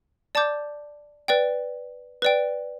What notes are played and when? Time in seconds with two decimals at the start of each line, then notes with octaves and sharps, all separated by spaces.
0.35 D5 A5 D6 G6
1.28 B4 D5 G5
2.22 B4 D5 G5